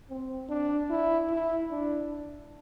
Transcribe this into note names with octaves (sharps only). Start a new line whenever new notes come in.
C4
D4
E4
E4
D4